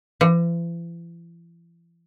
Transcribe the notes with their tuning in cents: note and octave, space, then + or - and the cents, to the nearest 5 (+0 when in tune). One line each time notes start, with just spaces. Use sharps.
E3 +45